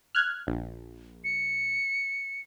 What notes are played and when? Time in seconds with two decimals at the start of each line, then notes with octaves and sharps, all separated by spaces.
0.15 F6 F#6 G#6
0.47 A#1
1.24 C#7